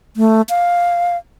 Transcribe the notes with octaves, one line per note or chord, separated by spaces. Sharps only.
A3
F5